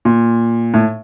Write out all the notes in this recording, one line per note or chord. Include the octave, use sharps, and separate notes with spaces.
A#2
A2